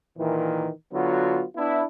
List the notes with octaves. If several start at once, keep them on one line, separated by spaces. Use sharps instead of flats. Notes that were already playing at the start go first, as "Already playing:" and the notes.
A#2 D#3 E3
D3 F#3 B3 F4 F#4
B3 D4 E4